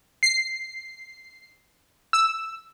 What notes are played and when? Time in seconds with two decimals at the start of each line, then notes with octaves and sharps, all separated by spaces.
0.23 C7
2.13 E6